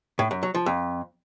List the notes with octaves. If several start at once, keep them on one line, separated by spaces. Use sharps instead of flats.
A2
F#2
F#3
F3
F2